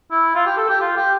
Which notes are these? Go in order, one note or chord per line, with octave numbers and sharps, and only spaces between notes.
E4
F4
G4
A4
G4
F4
G4